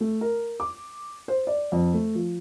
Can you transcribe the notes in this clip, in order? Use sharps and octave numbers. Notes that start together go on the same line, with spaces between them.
A3
A#4
D6
C5
D5
F2
A3
F3